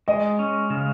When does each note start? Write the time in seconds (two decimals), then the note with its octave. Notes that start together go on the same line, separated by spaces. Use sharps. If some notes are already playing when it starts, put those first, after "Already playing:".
0.08 G#3 D#5
0.39 C#4
0.70 C#3